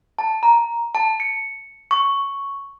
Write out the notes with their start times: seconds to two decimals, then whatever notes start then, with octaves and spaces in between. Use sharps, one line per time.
0.19 A5
0.43 A#5
0.95 A5
1.20 C#7
1.91 C#6